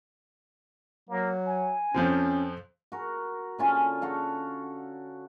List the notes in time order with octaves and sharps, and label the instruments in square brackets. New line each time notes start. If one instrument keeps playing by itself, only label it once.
[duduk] F#3 [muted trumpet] A#3
[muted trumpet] G#5
[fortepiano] F2 F3 C4 [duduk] C#4
[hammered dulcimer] F#4 A#4
D3 C#4 F4 G#5
F#4 A4 F5